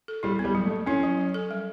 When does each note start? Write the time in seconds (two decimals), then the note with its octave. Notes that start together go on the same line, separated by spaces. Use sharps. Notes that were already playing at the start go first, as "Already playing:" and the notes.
0.08 A4
0.23 G3 E4
0.39 B3
0.45 G3
0.55 F#3
0.66 A3
0.71 F#3
0.86 C#4 E4
1.03 F#3
1.18 F#3
1.34 A4
1.51 G3